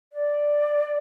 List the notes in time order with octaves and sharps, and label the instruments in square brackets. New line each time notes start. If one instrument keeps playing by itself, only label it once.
[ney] D5